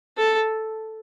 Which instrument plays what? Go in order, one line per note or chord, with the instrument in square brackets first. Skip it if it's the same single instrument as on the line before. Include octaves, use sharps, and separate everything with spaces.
[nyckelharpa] A4